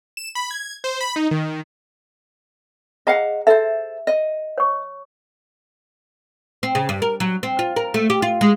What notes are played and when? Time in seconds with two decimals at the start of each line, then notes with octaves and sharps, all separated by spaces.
0.17 E7
0.35 B5
0.51 G#6
0.84 C5
1.01 B5
1.16 D#4
1.31 D#3
3.07 G#4 D#5 F5 F#5 A#5
3.47 A4 C5 E5
4.07 D#5
4.58 C#5 C#6
6.63 C4
6.75 C#3
6.89 G2
7.02 A#4
7.20 F#3
7.43 C4
7.59 F4
7.76 A#4
7.94 A3
8.10 G4
8.22 F4
8.41 G#3